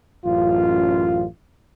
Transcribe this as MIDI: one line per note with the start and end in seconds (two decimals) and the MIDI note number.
0.25 1.25 33
0.25 1.25 42
0.25 1.25 65